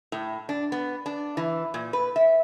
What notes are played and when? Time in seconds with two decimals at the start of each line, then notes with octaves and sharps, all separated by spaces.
0.12 A2
0.49 D4
0.72 B3
1.06 D4
1.37 E3
1.74 A#2
1.93 B4
2.16 E5